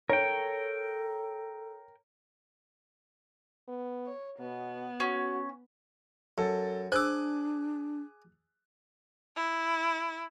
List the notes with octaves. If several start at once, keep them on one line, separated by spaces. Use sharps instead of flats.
A4 A#4 C#5 G5
B3
C#5
B2 B3
C#4 F#4
F#2 A4
D4 G#4 C5 D6 E6 F#6
E4